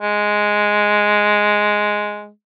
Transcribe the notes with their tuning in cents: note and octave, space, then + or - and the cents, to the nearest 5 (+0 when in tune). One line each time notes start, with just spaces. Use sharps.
G#3 +0